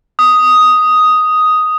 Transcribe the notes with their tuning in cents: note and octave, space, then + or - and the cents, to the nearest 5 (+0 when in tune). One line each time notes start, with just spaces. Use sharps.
D#6 +5